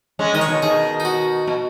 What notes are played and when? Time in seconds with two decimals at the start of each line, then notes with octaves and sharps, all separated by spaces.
0.19 G#3 C#4
0.34 D#3 G#3 D#5
0.41 C#5
0.48 B2 D#3
0.62 B2 D#3 G#4
1.00 D#4
1.05 F#4
1.47 B2